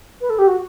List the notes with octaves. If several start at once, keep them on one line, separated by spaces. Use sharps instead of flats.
B4
A4
G4
F#4